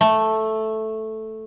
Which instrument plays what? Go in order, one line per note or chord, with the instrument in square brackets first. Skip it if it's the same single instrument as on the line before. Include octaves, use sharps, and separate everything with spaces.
[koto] A3